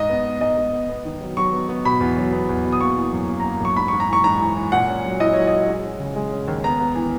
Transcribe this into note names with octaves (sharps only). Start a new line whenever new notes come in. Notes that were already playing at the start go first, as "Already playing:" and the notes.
Already playing: G#2 D#5
B3
B3
G#2 D#5
G#2
B3
B3
D#3
F#3
F#3 C#6
B3
B3
B2 B5
E2
F#3
B3
E2
B2
D#6
A#3 C#6
E3
F#2
A#3
A#3 A#5
F#2 C#6
G#2 B5
G#2 C#6
A#5
E3 C#6
G#2 A#5
E3
E3
A#2 F#5
C#4
F#3
E4 D#5
F#3 C#5
D#5
F#3
G#3
C#4
C#3
G#3
C#4
D#2
B3 A#5
B3
E3